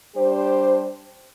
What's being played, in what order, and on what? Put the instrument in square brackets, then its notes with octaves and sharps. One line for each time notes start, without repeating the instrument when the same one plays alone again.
[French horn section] G3 D4 G4 C5